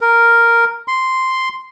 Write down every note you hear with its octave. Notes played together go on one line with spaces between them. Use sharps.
A#4
C6